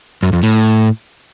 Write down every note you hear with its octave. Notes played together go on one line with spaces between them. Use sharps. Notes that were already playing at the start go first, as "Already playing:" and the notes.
F#2
F2
A2